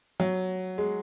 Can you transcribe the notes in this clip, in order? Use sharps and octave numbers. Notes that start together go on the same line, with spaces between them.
F#3
G#3